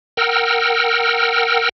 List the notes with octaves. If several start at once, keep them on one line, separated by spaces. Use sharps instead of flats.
A#4 F#5 G5 E6 F6